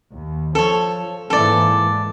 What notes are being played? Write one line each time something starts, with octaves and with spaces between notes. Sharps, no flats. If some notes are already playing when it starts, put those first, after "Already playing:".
D#2
F3 A4 C#5
G#2 E3 A#3 A4 D5